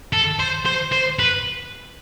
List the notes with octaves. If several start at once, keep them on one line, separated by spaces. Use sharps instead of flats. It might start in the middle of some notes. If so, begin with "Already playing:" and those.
A4
C5
C5
C5
B4